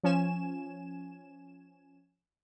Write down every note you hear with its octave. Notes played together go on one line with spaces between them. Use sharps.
F3 C#4 G#5 E7